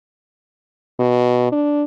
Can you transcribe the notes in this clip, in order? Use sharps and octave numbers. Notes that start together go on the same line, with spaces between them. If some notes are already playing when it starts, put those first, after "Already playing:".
B2
D4